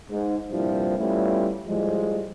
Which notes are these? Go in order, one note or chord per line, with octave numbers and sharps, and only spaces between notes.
G#2
C2 G2 A#2 F3 G3 E4
G3 A3 B3 C#4 E4 F4
A2 F3 G3 G#3